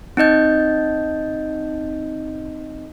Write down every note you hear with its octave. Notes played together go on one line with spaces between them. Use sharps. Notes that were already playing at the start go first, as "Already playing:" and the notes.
C4 D#4 D#5 G6